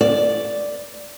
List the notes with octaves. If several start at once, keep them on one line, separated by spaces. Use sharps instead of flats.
D5